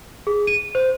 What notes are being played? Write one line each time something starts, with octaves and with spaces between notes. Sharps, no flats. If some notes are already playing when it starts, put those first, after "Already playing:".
G#4
D#7
C5